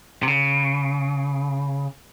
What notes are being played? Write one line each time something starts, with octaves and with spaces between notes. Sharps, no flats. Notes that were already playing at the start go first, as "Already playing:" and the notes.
C3
C#3